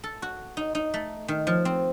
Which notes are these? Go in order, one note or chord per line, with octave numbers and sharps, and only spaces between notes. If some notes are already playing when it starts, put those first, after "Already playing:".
A4
F#4
D#4
D#4
A3
D#3
F3
C4